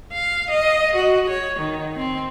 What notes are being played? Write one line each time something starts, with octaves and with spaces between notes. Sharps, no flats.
F5
D#5
F#4
C#5
D#3
C4